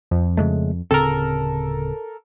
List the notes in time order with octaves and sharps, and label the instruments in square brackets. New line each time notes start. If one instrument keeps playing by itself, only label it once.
[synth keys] F2
[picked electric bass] C#3 G#3 A3
[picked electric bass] D1 C#3 C4 [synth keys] A4 A#4